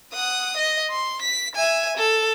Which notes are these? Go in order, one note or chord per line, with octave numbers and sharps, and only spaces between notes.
F#5 D#6
D#5
C6
B6
E5 G#5
A4